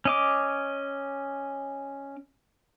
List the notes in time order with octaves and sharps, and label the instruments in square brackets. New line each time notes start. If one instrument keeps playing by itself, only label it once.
[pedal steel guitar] C#4 D#5 D6